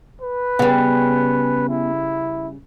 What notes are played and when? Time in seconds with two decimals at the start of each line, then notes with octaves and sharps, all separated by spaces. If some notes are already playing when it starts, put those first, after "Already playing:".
0.21 B4
0.59 C#3 G3 B3
1.69 E4